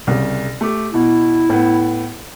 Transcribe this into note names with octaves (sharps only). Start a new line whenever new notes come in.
C2 C#3
A3 G4
B2 E4
A2 B3